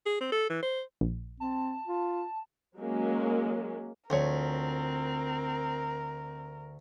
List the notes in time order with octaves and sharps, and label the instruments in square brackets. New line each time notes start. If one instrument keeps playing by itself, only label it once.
[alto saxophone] G#4
C4
A4
E3
C5
[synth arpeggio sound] A#1
[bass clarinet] C4 [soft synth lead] A5
[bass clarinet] F4
[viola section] F#3 G#3 A#3 C#4
[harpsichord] D2 [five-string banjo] F3 C#5 [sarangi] C4 [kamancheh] A#4